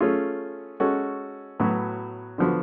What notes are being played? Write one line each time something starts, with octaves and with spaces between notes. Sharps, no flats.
A3 C#4 F4 G#4
G#3 C#4 F#4 A4
A2 F#3 B3 F#4
D3 F3 B3 F#4